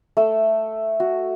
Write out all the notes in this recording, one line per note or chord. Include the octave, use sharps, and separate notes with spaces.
A3 E6
F#4